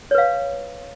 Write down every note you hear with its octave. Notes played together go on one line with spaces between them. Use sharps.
B4 C#5 F5